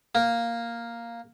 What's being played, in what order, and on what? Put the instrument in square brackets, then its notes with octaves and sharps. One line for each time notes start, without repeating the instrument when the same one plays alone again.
[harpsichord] A#3